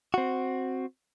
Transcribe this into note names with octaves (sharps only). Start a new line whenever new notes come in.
C4 F#4